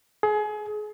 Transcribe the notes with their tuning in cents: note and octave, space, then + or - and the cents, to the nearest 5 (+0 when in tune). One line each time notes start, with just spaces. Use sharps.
G#4 +30